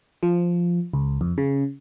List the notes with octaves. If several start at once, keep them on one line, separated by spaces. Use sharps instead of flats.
F3
C#2
F2
C#3